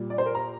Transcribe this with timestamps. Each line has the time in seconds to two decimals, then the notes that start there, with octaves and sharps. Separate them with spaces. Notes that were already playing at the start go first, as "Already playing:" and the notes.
Already playing: A#2 G3
0.10 D5
0.18 C5
0.26 A#4
0.35 A#5